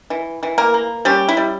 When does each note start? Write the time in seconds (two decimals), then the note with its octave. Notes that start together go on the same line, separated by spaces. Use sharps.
0.10 E3
0.43 E3
0.58 A#3 A#4
0.74 A#3
1.05 G3 C#4 G4
1.28 E4
1.37 G3